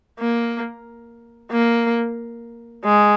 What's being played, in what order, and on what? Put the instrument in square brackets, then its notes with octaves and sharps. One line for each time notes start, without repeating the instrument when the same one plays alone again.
[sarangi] A#3
A#3
G#3